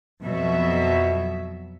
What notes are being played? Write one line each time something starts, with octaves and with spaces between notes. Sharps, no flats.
F2 B2 F#3 E5